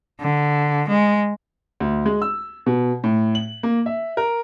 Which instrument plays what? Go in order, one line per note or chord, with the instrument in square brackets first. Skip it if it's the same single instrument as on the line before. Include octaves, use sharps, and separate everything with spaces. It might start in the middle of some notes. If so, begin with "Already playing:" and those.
[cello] D3
G#3
[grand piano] D2
G#3
E6
B2
A2
F#7
A#3
E5
A#4